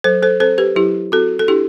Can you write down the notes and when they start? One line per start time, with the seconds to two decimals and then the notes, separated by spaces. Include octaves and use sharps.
0.04 F#3 A4 C5
0.23 A4 C5
0.40 C4 A4 C5
0.58 G4 B4
0.76 F#3 E4 G4
1.12 C4 F#4 A4
1.39 A4
1.48 D4 E4 G4